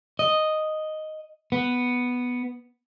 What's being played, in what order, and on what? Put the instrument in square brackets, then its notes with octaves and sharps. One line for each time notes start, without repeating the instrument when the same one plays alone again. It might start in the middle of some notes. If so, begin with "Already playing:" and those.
[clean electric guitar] D#5
B3